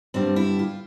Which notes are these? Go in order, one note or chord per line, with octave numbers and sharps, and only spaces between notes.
G2 D3 G3 B3 C4
E4
F4